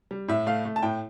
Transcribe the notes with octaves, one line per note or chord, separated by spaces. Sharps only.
G3
A2 E5
A3 F5
A3
A5
A2 G5